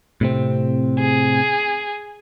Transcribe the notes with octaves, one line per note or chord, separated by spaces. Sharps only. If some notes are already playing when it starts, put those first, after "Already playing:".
A2 C3 C4
G#4